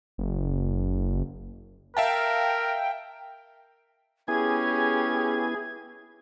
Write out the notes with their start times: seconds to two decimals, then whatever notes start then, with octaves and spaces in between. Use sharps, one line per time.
0.18 F#1
1.97 A#4 E5 F5 G5 A5
4.28 B3 C#4 E4 G4 G#4 G#5 G#6